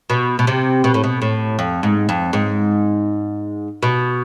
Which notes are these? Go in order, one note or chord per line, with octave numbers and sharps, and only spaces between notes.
B2
B2
C3
B2
A2
B2
A2
F2
G#2
F2
G#2
B2